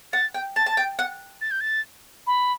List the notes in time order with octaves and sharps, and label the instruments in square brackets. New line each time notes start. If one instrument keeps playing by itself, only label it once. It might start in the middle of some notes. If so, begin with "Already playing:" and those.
[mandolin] F#5 [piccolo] A6
[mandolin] G5
[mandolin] A5 [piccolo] A6
[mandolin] A5
G5
F#5
[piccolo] A6
G6
A6
B5